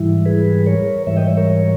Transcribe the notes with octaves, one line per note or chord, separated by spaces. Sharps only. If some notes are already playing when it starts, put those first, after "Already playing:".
Already playing: G#2 E3 G3 E4
G#4 B4
A#4 C#5
G#2 E3 G3 C#5 E5
D#5 G5
C#5 E5
A#4 C#5